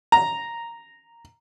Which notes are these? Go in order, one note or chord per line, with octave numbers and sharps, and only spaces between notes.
A#5